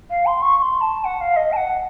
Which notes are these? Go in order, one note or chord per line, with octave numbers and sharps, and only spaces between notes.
F5
C6
C#6
C#6
C6
A5
F#5
F5
D#5
A5
F#5